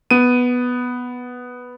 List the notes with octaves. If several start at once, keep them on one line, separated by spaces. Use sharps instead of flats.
B3 D#7